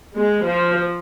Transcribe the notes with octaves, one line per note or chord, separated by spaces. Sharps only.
G#3
F3